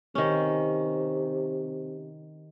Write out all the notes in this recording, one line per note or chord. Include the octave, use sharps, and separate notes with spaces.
C3 D#3 C#4